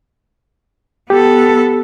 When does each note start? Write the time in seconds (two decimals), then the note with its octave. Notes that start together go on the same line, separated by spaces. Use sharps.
1.10 B3 G4 A4